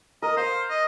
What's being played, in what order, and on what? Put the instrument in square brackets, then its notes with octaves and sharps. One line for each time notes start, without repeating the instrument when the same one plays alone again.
[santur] A#4 [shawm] D#5
[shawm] C5 [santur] F5
[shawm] D#5